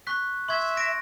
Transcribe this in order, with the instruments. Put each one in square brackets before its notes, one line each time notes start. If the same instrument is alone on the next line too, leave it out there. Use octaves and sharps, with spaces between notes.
[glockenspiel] C#6 F#6 B6
[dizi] E5 [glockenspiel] C6 C#6 G#6
[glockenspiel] A#6 D7